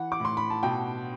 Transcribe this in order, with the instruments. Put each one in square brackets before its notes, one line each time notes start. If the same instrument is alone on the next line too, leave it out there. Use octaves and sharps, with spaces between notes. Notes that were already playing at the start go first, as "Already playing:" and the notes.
Already playing: [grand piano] E3 [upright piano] F#5
[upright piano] D6
[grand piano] A2 [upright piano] C6
[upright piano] B5
A5
[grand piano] B2 [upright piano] G5